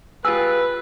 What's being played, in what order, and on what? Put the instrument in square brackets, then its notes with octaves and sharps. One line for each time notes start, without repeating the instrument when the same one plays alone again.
[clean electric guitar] F4 G4 G#4 [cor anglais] B4 [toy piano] E6